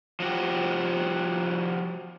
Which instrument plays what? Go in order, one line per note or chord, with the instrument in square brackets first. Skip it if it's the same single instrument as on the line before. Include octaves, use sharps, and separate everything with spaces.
[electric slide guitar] F3 F#4 G4